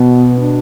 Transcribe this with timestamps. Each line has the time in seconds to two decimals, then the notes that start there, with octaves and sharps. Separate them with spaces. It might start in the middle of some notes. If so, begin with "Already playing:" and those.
Already playing: B2 B3
0.40 D4